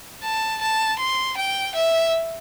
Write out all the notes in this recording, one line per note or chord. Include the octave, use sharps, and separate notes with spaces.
A5
A5
C6
G5
E5